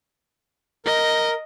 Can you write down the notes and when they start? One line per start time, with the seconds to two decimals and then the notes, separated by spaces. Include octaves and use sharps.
0.85 A#4 D#5